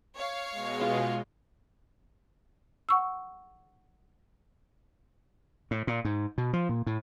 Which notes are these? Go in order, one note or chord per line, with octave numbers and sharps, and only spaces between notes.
C#5 F5
B2 G#3
F4
F#5 C#6 E6
A2
A#2
G#2
B2
F3
A#2
A2